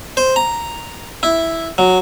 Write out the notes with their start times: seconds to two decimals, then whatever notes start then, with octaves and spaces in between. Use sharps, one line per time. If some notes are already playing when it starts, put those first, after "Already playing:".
0.17 C5
0.36 A#5
1.23 E4
1.78 F#3